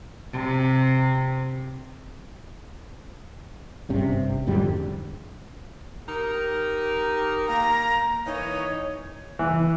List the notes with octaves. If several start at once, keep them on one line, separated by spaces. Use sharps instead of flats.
C3
G#1 G2 C3 C#4
F2 G#2 D3 G3
D#4 G4 A#4
A#3 A#5
E3 A#3 D#4 C#5
E3